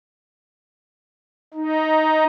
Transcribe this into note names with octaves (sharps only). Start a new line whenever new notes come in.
D#4